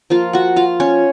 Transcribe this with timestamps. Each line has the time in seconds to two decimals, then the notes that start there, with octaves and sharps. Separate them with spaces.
0.10 F3 A#3 F4 F5
0.33 F#4 F#5
0.56 F4 F5
0.80 C#4 C#5